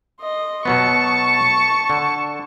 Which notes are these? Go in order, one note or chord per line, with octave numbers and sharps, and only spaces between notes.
D#5 C6
B2 F#3 B3 A5 C#6
D3